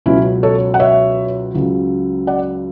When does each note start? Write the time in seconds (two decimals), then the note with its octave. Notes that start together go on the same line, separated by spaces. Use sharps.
0.06 C#2 B2 F#3 C#4 E4
0.43 A4 C#5
0.74 F#5
0.80 C#5 E5
1.54 C#2 C#3 F#3
2.27 D5 F#5